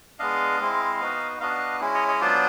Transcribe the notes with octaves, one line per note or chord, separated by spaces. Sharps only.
G#3 B3 D4 D#5 F5
G#3 C4 E4
B3 D#4 F#4
B3 D4 F#4 D#5 F5
G#3 C#4 E4
C#5 D#5
C#5 D#5
F#3 B3 D4 F4 C5 D5